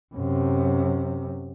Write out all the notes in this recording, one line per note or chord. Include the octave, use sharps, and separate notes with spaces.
F#2 C3